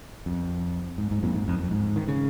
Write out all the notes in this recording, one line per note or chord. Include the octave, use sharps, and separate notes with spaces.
F2
G#2
G#2
F2 A#2
G#2
F2
F2
G#2
D#3
C#3